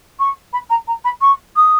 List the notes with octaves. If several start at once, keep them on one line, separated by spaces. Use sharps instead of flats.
C#6
B5
A#5
A#5
B5
C#6
D#6